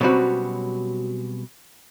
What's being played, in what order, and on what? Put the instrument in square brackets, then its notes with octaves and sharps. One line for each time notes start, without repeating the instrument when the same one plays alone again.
[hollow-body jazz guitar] B2 F#3 G3 C4 C#4 F#4